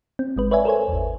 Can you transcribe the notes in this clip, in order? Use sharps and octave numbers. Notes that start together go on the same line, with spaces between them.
C4
G#1 G#3 B4
B4 C#5 D5 E5 G#5
A4 A#4 C5 C#5 G#5
G#1 E2